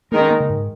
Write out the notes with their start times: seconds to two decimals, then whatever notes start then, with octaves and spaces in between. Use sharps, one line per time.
0.11 D#3 G#3 A#3 D#4 A#4
0.21 C#4
0.30 A#3
0.40 C#3
0.49 G#2